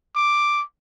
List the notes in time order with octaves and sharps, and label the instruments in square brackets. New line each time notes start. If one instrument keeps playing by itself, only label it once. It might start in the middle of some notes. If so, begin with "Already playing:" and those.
[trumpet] D6